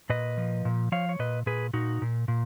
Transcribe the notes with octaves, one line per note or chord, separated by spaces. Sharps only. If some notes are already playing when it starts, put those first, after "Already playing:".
A#2 B4 D#5
F3
A#2
F3 C#5 F5
C#5
A#2 B4 D#5
A#2 G#4 B4
A#2 D#4 F#4
A#2
A#2